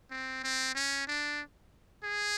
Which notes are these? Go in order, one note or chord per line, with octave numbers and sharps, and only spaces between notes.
C4
C4
C#4
D4
G#4